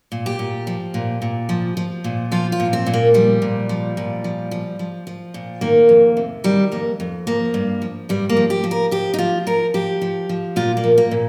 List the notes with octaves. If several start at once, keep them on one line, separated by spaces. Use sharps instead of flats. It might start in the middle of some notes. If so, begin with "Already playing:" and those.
A#2
G4
A#2
F3
A#2
A#2
F3
F3
A#2
F3 F4
F4
A#2
C4
A#2
A#3
F3 G3
A#2
F3
A#2
F3
F3
F3
F3
A#2
D#3 A#3
F2
C3
D#3 G3
F2 A#3
F2
F3 A#3
G2
F3
G2 G3
A#3
F3
G4
F3
A#4
F3 G4
D#4
F3 F4
F3 A#4
F3 G4
F3
F3
A#2 F4
A#3
F3
A#3
A#2